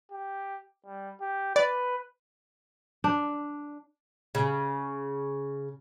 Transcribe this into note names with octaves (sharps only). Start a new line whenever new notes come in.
G4
G3
G4
B4 D5
D4
C#3